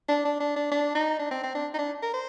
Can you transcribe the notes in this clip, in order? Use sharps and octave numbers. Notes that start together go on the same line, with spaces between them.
D4
D4
D4
D4
D4
D#4
D4
C4
C4
D4
D#4
D4
A#4
C5